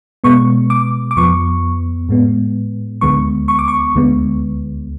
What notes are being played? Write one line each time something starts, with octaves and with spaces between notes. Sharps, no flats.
B2 G#3 B3 C#6
D6
D6
F2 F3 B3 C#6
A2 G#3 B3
D2 D3 G#3 B3 C#6
C#6
D6
C#6
D2 D3 G#3 B3